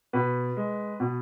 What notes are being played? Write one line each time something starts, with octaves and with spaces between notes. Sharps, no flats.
B2 B4
G#3
B2